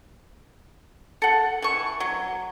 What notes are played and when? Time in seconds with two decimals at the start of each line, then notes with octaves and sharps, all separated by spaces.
1.22 A4 F#5
1.62 E3 C#6
2.00 F#3